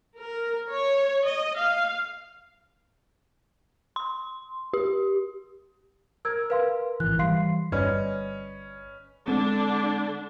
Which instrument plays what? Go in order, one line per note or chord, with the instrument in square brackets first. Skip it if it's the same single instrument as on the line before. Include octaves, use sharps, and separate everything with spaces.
[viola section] A#4
C#5
D#5
F5
[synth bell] C6
G4
[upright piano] A#4 [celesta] E6 G#6
[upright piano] A#4 [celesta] B4 F5 C6
[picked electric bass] G#1 E3 [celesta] F#6
[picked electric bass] E3 G3 [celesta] F5 C6 C7
[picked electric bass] G1 G2 [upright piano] C#4 B4 D#5 [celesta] D5 F6
[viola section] D3 D4 [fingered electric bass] G#3 C4